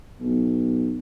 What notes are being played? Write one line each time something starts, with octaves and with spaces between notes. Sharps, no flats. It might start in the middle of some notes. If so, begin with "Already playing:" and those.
B1